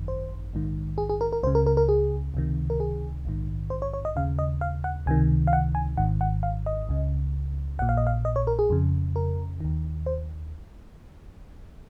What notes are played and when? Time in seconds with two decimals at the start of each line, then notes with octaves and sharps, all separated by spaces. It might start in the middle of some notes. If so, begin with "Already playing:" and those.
Already playing: G#1 F#2 D#3
0.08 C5
0.53 A#1 G#2 D#3
0.98 G#4
1.09 G#4
1.21 A#4
1.33 A#4
1.43 C#2 C5
1.47 C#3
1.55 A#4
1.66 A#4
1.77 A#4
1.89 G#4
2.34 C#2 C3 D#3
2.70 A#4
2.80 G#4
3.25 A#1 G#2 D#3
3.70 C5
3.82 C#5
3.93 C#5
4.05 D#5
4.16 D#2 C#3 F5
4.39 D#5
4.61 F5
4.84 F#5
5.06 C#2 C3 D#3 G#5
5.47 F5
5.53 F#5
5.75 G#5
5.97 G#1 G#2 D#3 F#5
6.21 F#5
6.43 F5
6.66 D#5
6.89 C#2 C#3
7.79 A#1 A#2 F#5
7.89 F5
7.97 D#5
8.07 F5
8.25 D#5
8.36 C#5
8.47 A#4
8.59 G#4
8.70 F2 C#3
9.16 A#4
9.60 D#2 D#3
10.06 C5